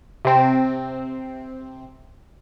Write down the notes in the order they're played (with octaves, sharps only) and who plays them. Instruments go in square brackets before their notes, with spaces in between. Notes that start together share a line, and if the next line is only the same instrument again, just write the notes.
[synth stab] C3 C4